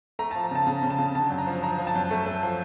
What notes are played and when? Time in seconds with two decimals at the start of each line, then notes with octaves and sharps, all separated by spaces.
0.19 A3 A#5
0.31 A5
0.35 F3
0.44 A#5
0.51 C#3 A5
0.67 C#3 A#5
0.83 C#3
0.90 A5
0.99 C#3
1.15 D3 A5
1.30 F#2
1.38 A#5
1.47 F3
1.63 F3 A#5
1.78 F3
1.87 A5
1.95 F#2
2.11 A3
2.26 A3
2.43 F3